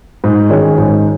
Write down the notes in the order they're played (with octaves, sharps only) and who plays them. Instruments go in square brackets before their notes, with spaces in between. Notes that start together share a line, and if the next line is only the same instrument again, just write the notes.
[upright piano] G#2
D#3 G#3 C#4
G#2